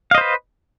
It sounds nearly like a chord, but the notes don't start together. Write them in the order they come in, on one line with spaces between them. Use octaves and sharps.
F5 D#5 C5 B4